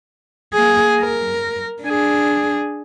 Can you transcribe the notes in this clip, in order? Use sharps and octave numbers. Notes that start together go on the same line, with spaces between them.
A#3 G#4
A#4
D4 G#4